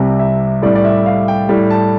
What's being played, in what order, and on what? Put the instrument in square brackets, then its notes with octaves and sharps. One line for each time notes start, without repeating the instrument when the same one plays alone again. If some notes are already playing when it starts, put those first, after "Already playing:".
Already playing: [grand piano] C2 C3 G3 E5
E5
A2 G3 D5
D5
E5
F5
G5
A2 G3
A5